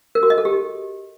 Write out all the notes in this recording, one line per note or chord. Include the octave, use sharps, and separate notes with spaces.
A#4
F#4
D#5
A4
G4